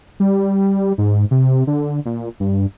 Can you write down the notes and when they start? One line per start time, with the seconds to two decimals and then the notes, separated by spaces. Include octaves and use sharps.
0.20 G3
0.98 G#2
1.31 C3
1.67 D3
2.06 A#2
2.40 G2